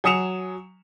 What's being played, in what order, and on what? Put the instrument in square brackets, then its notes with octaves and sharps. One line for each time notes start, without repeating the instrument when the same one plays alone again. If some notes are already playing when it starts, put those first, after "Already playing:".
[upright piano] F#3 G#5 D#6 C#7 E7 F7